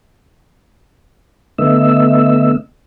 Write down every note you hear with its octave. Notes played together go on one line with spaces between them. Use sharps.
D3 A3 B3 D#5 E5 E6